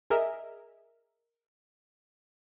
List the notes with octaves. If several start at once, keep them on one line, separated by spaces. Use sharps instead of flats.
G#4 A#4 D#5 E5